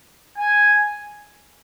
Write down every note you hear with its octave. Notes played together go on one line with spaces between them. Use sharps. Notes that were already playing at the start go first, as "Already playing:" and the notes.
G#5